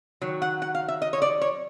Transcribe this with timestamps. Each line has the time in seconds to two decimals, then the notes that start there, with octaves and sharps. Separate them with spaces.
0.21 D#3 F#3
0.42 F#5
0.62 F#5
0.75 F5
0.88 E5
1.02 D#5
1.13 C#5
1.22 D5
1.41 C#5